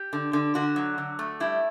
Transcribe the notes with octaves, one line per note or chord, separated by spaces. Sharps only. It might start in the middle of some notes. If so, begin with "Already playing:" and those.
Already playing: G4
D3
D3
D3 F#4
F#3
D3
A3
G3 E4